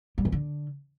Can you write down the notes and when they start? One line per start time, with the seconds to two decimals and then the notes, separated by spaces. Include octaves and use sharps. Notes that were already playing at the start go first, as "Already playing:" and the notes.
0.18 G3
0.25 F#2
0.32 D3